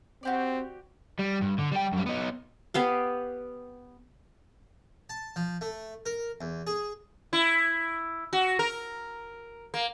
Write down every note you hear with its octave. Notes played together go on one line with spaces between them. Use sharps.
C4 F#4 G4 D5
G3
G2
D3
G3 G5
F#2 G3
B3 D#4
B3 G4 F5
A5
F3
A3
A#4
E2
G#4
E4
F#4
A#4
A#3